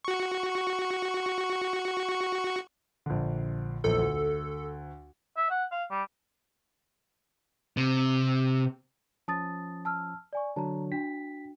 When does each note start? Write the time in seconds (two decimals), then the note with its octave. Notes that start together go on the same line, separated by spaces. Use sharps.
0.05 F#4 C#6
3.06 A#1 D3
3.84 A#1 E2 A4
3.98 D2
5.37 E5
5.50 F#5
5.72 F5
5.91 G3
7.77 C3
9.28 F3 C#4 A5 D#6 A6
9.85 A5 E6 F6
10.33 D5 G#5 C#6
10.56 D3 F#3 D4 A5 A#5
10.92 D4 F#4 G5 B6